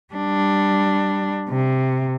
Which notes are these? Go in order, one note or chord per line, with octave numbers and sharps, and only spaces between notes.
G3 D4
C3